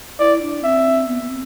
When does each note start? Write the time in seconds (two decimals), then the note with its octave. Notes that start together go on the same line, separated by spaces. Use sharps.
0.19 E4 D5
0.41 D4
0.64 C4 E5
1.07 B3
1.21 B3
1.29 C4